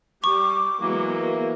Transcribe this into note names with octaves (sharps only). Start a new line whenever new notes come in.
G3 G4 C#6 D6
E3 F#3 G#3 A#3 B3